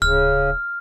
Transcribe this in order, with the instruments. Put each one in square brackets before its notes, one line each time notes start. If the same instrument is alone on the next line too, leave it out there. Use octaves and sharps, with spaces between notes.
[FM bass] D1 [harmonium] C#3 [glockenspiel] F6